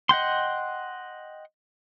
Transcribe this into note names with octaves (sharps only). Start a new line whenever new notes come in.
D#5 F#5 G5 C6